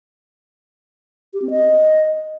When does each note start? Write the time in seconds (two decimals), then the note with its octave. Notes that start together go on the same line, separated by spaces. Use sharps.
1.33 G4
1.42 C4
1.50 D#5